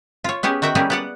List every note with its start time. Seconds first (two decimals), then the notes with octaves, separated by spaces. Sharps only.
0.24 F4 C#5
0.43 B3 C#4 G4 G#4
0.62 D#3 F#4 E5 F#5 G5
0.75 G3 A#3 C#4 E4 G4 G#4
0.90 B3 D5 F#5